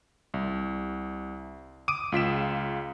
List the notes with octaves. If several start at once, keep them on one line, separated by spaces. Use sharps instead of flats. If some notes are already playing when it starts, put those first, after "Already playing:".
C2
D6 D#6 D7 D#7
C#2 F4 B6 E7